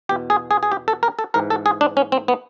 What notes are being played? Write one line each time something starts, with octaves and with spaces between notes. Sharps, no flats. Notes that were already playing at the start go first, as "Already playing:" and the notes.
E2 B2 G4
G#4
G#4
G#4
G4
A4
A#4
A4
G#2 E3 A#4
A4
G#4
D4
C#4
C4
B3